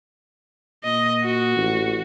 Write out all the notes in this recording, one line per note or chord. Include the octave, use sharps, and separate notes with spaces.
A#2 D#5
F#4
A1